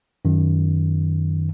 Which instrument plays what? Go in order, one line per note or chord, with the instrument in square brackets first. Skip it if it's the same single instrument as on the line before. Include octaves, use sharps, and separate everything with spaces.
[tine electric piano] F#2 D#3